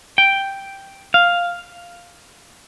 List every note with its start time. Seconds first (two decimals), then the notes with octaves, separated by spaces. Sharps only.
0.18 G5
1.14 F5